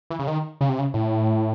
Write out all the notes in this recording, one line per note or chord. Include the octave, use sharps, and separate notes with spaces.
E3
C#3
D#3
C#3
C3
C#3
A2